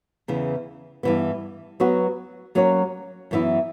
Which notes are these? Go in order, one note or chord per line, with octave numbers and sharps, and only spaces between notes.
E2 C#3 E3
G2 E3 B3
F#3 B3 F#4
F#3 A#3 C#4 F#4 C#5
F#2 E3 B3 E4